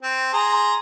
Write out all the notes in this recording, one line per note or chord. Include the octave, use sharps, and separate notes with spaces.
C4
G#4 A#5 C6